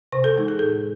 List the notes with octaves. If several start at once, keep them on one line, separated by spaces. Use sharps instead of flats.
C3 C5
A4
E3 G#3 D#4
G#4
A2 A4